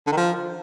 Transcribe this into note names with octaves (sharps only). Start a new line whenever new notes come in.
D3
D#3
F3